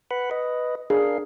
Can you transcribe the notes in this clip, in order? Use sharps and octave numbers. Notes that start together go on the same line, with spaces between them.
B4 F#5 B5
B4 D#5
D4 G#4 A#4 F5